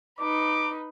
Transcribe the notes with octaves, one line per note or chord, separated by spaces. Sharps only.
D#4 B4 D6